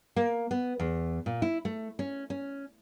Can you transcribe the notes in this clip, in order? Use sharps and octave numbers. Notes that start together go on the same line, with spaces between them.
A#3
B3
E2
A#2
E4
A3
C#4
C#4